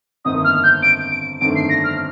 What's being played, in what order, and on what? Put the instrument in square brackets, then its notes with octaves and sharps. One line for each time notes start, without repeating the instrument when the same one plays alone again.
[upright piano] G1 F2 D#3 A#3 D#4 [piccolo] D#6
[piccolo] F6
G6
D7
D7
[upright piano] G1 F2 D#3 A3 D4 [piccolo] D7
[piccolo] C7
A#6
F6